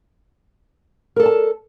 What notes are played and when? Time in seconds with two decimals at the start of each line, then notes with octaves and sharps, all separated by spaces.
1.16 A#4
1.20 A4
1.23 D5
1.26 A5